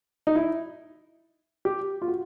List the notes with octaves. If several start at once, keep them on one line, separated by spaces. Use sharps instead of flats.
D#4
E4
G4
F4
F#4